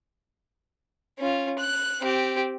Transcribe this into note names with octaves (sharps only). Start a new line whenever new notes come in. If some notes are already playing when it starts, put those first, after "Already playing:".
C#4 F4
F#6
C4 G4